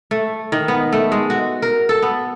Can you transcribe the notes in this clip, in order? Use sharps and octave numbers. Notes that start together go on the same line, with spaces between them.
A3
D#3
B3
A3
G#3
F#4
A#4
A4
B3